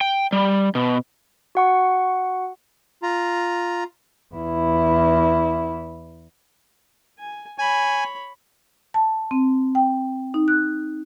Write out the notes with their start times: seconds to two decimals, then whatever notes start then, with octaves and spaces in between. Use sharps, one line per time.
0.01 G5
0.32 G3
0.75 B2
1.55 F#4 F#5 C#6
3.03 F4 A#5
4.35 E2 E4
7.19 G#5
7.58 C#5 G#5 B5
8.94 A5
9.31 C4
9.75 G5
10.34 D#4
10.48 F#6